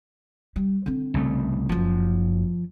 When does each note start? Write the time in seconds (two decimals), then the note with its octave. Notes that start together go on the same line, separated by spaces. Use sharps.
0.56 G3
0.86 D3 C4
1.14 C2 C#3 A3
1.69 F#1 F#2 F3